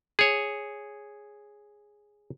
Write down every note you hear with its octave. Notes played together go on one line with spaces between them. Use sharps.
G#4 C#5